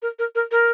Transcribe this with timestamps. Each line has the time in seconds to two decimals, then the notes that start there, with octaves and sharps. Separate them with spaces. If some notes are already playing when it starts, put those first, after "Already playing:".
0.02 A#4
0.19 A#4
0.35 A#4
0.51 A#4